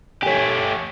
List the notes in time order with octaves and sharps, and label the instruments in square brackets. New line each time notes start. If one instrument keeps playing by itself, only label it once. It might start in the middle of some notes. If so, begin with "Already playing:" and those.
[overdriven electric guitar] A3 G4 [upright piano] C#5 G#5